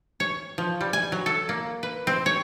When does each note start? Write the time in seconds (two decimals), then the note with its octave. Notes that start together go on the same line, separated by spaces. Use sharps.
0.20 C#5
0.58 F3
0.81 G3
0.93 G#5
1.12 F#3
1.26 A4
1.49 A#3
1.83 B4
2.07 C4
2.26 C#5